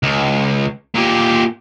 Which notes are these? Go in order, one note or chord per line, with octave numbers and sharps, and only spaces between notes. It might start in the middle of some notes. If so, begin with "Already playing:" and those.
C#2
A#2 G4